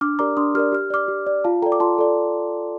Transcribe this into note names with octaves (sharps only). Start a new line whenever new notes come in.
D4 D6 F6
G4 A#4 D5 A#5 D6
D4 C6 D#6
G4 A#4 D5 F6
G4 F6
D5 D6 F6
G4
D5
F4 F5 A5
A4 D5 G5 A#5
D6
F4 A5 C6
A4 D5